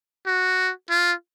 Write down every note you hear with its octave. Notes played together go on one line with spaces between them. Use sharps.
F#4
F4